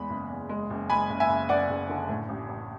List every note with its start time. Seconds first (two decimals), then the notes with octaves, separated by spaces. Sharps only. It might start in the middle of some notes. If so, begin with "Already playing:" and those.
Already playing: E2 G#3 B5
0.10 F#1
0.30 E2
0.49 G#3
0.70 F#1
0.90 G#3 G#5 B5
1.09 F#1
1.20 E5 G#5
1.29 F#1
1.49 F#1 D5 F#5
1.69 F#1
1.89 D3
2.09 A2
2.29 A1
2.49 A1